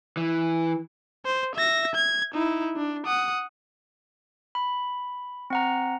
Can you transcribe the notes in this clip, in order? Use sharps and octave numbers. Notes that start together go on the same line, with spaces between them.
E3
C5
E5 A#6
G#6
D#4 E4
D4
F#5 D#6
B5
C4 F#5 A#5